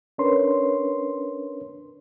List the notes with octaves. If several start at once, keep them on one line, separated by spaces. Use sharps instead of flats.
C#4 D4 A#4 B4 C#5 C6